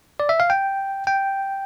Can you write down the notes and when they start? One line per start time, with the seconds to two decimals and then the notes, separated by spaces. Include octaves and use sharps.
0.20 D5
0.29 E5
0.40 F5
0.50 G5
1.07 G5